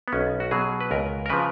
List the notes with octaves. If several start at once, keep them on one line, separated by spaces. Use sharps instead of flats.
B3
B1 C#4
F#4
B2 F#3 G#4
B4
C#2 A#4
A#4
C#3 F3 B4